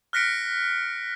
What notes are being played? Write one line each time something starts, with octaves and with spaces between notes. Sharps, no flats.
F6 F#6 A#6 B6 C#7 D7